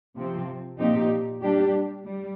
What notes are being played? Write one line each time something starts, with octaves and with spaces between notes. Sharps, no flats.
C3 F3 C4
A#2 F3 C4 D#4 G4
G3 D4 G4
G3